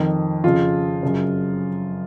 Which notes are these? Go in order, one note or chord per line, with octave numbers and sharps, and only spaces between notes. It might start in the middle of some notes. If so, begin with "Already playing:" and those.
Already playing: F2 D#3
F2 C#3 F4
F#2 C#3